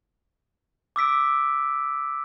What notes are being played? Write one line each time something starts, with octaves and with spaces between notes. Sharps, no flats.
D6 E6 B6 D7